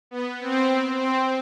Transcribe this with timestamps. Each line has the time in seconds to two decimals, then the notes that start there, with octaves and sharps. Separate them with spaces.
0.11 B3
0.40 C4
0.99 C4